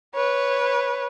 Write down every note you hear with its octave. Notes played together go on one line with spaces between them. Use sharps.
B4 C#5